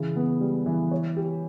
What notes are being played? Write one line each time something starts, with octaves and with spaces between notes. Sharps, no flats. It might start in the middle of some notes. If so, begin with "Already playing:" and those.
Already playing: C#3 E3
B3
G3
E3
C#5
G4